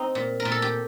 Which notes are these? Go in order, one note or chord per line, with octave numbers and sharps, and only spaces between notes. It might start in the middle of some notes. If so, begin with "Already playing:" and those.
Already playing: C4 D#4
A#2
A#4
A#2
A4
G4